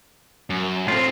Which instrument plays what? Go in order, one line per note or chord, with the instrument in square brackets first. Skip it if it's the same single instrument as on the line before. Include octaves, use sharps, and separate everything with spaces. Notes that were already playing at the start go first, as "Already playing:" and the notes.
[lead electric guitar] F#2
[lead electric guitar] A2 C4 [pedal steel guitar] F4